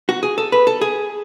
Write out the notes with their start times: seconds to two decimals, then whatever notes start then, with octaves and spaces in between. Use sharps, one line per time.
0.09 F#4
0.23 G#4
0.38 A4
0.52 B4
0.67 A4
0.81 G#4